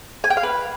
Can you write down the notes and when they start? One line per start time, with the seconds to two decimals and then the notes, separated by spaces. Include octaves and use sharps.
0.24 G#5
0.30 G5
0.37 F5
0.43 B4